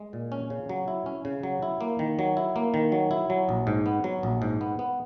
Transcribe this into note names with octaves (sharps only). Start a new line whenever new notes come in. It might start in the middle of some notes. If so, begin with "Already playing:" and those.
Already playing: G#3
A#2
C#4
C#3
F#3
E4
C#4
C#3
F#3
E4
A#3
D#3
F#3
E4
A#3
D#3
F#3
E4
F#3
A#1
G#2
B3
F#3
A#1
G#2
B3
B3